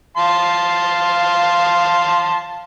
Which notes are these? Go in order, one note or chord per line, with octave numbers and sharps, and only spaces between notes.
F5 A5 C6